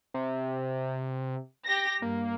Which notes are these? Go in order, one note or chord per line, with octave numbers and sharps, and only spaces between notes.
C3
G4 A#6
G2 A#3